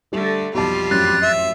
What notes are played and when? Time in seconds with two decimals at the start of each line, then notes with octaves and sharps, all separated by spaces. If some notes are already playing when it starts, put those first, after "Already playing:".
0.12 D3 G3 A3 G4
0.54 B1 F2 C3 G3 F4 A5
0.91 A1 F#2 F#6 A6
1.22 E5